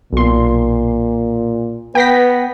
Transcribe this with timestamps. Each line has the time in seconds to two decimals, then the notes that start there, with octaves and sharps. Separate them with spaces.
0.13 B1 A#2 C6
1.95 B3 B4 G5 A#6 B6